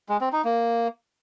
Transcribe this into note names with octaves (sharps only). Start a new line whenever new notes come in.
G#3
C4
D#4
A#3